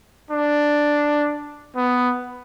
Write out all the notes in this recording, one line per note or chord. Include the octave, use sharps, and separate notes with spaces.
D4
B3